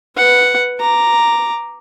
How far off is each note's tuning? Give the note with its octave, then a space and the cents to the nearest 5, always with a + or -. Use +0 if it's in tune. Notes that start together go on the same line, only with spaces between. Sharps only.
B4 +0 F#5 +0
A#5 +0 D6 +5